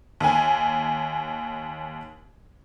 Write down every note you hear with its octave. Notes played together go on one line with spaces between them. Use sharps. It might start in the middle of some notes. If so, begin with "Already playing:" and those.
D#2 G#5